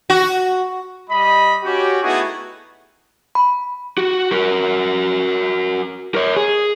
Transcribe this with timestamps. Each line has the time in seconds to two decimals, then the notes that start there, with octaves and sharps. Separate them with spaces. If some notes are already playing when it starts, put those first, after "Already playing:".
0.10 F#4
1.10 G3 D#5 B5
1.64 C#4 F#4 G4
2.03 A3 B3 D#4 E4 F#4 G#4
3.35 B5
3.98 F#4
4.32 F#4 A#4
6.15 A#4 C#5
6.37 G#4